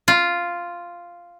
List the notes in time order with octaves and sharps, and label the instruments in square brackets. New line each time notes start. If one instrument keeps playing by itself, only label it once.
[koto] F4